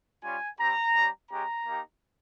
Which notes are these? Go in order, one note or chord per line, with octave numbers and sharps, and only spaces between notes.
G3 C#4 F4 G#5
G3 C4 G4 A#5
G3 C#4 G4
G#3 C#4 G4 A#5
A#3 D#4 G4